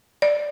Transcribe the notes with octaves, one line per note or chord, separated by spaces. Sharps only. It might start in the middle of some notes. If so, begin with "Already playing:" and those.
D5